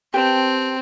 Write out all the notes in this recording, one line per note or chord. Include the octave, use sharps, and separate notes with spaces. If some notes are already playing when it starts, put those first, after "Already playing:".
C4 G4 B4 A5